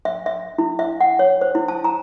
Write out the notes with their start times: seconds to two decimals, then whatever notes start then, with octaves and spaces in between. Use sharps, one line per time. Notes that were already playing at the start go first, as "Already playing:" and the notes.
0.05 E5
0.26 E5
0.58 E4
0.79 E5
1.01 F#5
1.19 C#5
1.41 C5
1.55 E4
1.68 A5
1.84 A#5